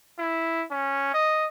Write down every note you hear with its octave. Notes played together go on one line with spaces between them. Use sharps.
E4
C#4
D#5